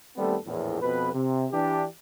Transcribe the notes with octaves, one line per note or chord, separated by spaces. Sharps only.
D#2 G3 A3 B3 C4 A4
A#1 E2 A2
F2 B2 B4
C3
E3 D4 G4